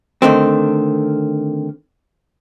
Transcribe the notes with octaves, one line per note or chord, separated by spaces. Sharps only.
D3 D#3 A3 C4